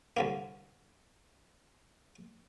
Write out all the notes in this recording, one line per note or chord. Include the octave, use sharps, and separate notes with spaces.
C2 D3 A#3